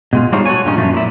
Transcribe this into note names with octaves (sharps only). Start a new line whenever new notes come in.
B2 G#3 F4
G3 D4 D#4 F4 C5 C#5
F#4 A4 C#5 G#5
G2 A#2 D#3 C#4
F#2 A#2 F3 A3
A#2 E4